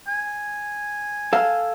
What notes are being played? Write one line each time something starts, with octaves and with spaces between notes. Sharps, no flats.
G#5
A4 F5